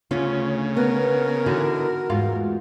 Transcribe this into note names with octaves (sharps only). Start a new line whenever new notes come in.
D2 C#3 C#4 F4
B3 A#4
D3 E3 D#4 F#4
E2 G#2 F4